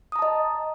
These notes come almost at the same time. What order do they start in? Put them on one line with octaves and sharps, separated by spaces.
D#6 A#5 A5 D#5